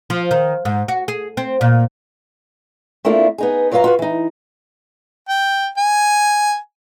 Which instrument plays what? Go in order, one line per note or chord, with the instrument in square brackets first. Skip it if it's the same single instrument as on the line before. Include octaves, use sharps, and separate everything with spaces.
[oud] F3
D#3
G#2
F#4
G#4
C4
A#2
[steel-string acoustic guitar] A3 A#3 C4 D4 E4 F4
B3 D#4 G#4
F#2 F#3 F4 B4 F5 A#5
F4 F#4 B4
E3 D#4
[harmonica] G5
G#5